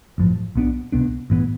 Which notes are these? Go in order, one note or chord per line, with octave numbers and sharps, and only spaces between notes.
A1 G2 F3
B1 B2 B3 D4
C2 B2 B3 D4
A1 G2 E3 B3